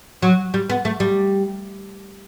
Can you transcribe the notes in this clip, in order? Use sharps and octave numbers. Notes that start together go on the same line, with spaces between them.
F#3
G3
B3
A3
G3